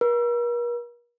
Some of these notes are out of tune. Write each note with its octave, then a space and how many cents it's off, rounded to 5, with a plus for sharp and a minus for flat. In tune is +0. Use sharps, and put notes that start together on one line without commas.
A#4 +45